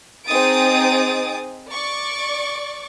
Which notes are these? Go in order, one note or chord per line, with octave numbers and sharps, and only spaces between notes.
C4 D#4 G#4 D#6 A6 D7
D5 C#6 D6